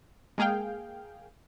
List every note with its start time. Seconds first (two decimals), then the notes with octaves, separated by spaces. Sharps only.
0.38 G#3 A#3 G#4 F5 G5